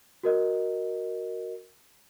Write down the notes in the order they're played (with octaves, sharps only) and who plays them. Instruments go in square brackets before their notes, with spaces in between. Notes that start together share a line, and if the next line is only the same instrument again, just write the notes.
[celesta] F#4 A#4 D#5